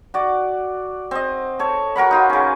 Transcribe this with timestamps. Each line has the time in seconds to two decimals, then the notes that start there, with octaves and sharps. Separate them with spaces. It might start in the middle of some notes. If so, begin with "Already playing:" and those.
0.14 F#4 D5
1.11 C4 D#5
1.59 A4 C#5
1.96 F#4 A#4 F#5 B5
2.11 D#4 F4 F#4
2.30 C#3 C#4